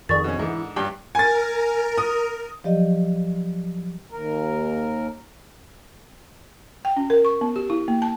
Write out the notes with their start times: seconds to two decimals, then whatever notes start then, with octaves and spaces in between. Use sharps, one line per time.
0.09 F2 D#3 G#4 D5 C#6 A6
0.24 B2 C#4
0.39 G#2 D3 E3
0.76 C#2 G2 G3 G5
1.15 A#4 G#5 A6
1.98 D#6
2.64 F3 F#3 G4 D5 D#5
4.11 D#2 A#4
6.85 G5
6.97 C#4
7.10 A#4
7.25 C#6
7.41 B3
7.56 G4
7.70 E4
7.88 A#3
8.02 A5